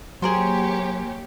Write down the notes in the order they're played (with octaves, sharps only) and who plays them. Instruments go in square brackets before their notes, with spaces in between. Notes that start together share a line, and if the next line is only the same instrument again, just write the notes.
[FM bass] F#3 [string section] A#3 G4 C#5 [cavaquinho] G#4 A#4 C5